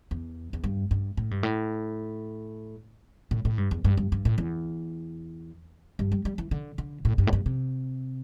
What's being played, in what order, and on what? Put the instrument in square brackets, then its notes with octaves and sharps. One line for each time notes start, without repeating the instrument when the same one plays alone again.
[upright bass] E2
E2
G2
G2
A2
G2
A2
A2
A2
G2
E2
G2
G2
G2
A2
E2
G2
G3
G3
E3
D3
D3
A2
G2
A2
G2
C3